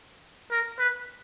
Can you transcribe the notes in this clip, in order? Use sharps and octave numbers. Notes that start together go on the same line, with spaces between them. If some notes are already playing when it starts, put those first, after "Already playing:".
A#4
B4